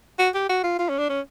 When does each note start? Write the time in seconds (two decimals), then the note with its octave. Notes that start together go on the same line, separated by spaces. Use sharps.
0.19 F#4
0.34 G4
0.49 F#4
0.64 F4
0.79 F4
0.89 C#4
0.98 D4
1.09 C#4